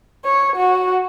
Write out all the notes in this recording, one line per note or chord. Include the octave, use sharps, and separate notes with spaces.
C#5
F#4